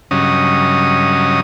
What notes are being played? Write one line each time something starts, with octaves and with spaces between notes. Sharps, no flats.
G2 C#3 F#3 C#4 D#5 D#6